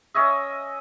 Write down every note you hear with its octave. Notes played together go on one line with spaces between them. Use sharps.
C#4 C#5 D#5 E5